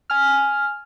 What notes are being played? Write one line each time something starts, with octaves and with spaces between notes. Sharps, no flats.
G#5 F6